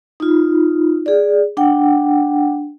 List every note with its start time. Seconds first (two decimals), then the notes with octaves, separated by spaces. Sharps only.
0.20 D#4 F4
1.06 G#4 D5
1.57 D4 F#5 G5